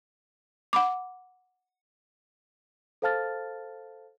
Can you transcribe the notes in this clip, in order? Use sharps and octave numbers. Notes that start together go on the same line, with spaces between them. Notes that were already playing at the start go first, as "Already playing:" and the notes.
F#5 B5 D6
A4 C5 F5 A5 F6 A6